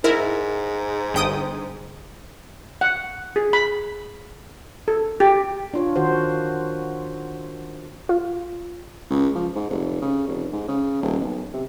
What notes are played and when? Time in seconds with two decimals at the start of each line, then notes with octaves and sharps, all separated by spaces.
0.04 G#2 E4 A#4
1.14 G1 G5 D#6
2.81 F#5
3.36 G#4
3.53 B5
4.88 A4
5.20 G4
5.74 D4 F4 C#5
5.96 D#3 F#4 C5
8.09 F4
9.10 C#2
9.35 F3
9.55 G#2
9.70 F1
10.02 C#3
10.27 F1
10.52 G#2
10.68 C#3
11.02 D#1
11.20 B1
11.53 C3